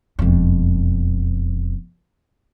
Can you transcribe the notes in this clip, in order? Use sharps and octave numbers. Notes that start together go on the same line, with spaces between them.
E1 F2